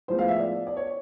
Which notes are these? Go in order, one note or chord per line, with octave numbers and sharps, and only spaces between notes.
A2 F3 G#3 B3 C5
F5
E5
D5
D5
C#5